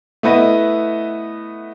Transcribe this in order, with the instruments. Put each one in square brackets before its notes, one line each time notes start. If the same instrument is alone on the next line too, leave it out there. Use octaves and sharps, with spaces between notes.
[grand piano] A3 B3 E4 B4 D#5